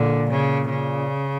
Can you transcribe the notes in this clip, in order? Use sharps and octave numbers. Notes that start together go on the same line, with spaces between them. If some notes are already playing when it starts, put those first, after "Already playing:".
Already playing: A#2 D3
C#3
C#3